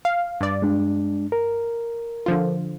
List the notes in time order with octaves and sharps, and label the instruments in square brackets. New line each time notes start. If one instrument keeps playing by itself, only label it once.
[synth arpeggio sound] F5
G2 D5
[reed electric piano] G#3 D4
A#4
[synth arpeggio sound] D3 F3 F4